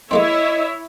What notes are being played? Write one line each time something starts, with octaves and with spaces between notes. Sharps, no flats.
G#3 A#3 C4 E4 C#5 D#5 E5